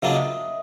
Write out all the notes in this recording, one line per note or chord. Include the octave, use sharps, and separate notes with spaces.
C#3 F#3 A#3 D4 F4 E5
D#5